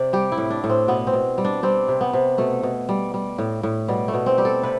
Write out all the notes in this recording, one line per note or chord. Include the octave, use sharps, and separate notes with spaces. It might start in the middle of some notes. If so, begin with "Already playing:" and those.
Already playing: C3 C5 D5
G3 G4
E4
A2
D4
A2
C4
B2 B3
C4
B2
G3
D4
G3 C4
C3
B3
C3
B2 A3
B2
G3
G3
A2
A2
B2 G3
A3
B2
C4
G3 G4
A4
C3 B4